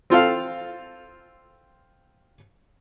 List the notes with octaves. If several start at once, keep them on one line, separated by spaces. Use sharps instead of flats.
C4 F4 A4 F5